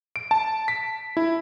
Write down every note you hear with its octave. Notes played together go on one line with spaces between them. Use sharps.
D7
A5
B6
E4